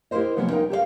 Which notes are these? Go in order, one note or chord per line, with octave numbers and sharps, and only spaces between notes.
E4 G4 G#4 A#4 C5 D#5
C3 F3 F#3 A#3 B3 C#4
D#4 A#4 F#5 G5
G4 A4 D5 F5